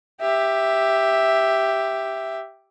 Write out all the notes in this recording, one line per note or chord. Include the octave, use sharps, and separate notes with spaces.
G4 E5